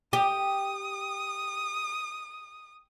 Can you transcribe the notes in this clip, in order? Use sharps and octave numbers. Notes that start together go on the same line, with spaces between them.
G4 D#6